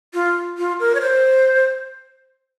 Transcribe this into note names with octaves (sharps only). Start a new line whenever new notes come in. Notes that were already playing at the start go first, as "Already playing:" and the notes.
F4
F4
A#4
C#5
C5